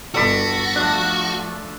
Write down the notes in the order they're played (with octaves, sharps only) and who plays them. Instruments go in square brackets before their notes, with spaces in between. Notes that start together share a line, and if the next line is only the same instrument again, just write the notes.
[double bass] G1 [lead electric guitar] F#4 [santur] A4 D5 B5
[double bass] F3 A3 [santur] D4